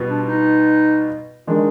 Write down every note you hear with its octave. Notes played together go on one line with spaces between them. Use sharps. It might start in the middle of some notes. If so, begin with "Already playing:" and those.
Already playing: B2 G3 B3 F4
D4
D#4
D#3 G#3 D4 F4